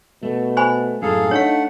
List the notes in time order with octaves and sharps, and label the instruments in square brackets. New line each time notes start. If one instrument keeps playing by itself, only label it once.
[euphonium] B2 [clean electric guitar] A3
[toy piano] C5 G#5 B5
[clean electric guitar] F#2 A2 A#5 [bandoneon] G#4 A4 F5
[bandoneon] A3 F#5 [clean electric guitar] D4 [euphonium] D#4 [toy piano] C#5 F5